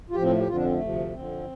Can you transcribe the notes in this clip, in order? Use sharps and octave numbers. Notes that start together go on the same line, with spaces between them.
F4
A2 F3 G4
C4
A3
G4
F2 D3 F3 F4
D4
C4
A3
D2 C3 F3
F2 D3 F3 C4